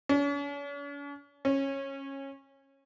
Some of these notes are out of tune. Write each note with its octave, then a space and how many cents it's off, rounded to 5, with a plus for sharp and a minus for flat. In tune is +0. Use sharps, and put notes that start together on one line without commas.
C#4 +45
C#4 -20